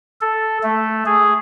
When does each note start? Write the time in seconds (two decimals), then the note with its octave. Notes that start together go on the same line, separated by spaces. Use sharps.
0.21 A4
0.63 A3
1.06 G#4